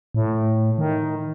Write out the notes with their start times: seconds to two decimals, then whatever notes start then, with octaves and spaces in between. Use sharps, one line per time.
0.15 A2
0.78 D#3